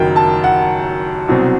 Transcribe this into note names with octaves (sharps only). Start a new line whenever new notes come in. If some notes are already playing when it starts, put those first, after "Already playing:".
Already playing: F#1 F#2 D#3 F#3 G5
A5
F#5
C2 B2 F#3 C4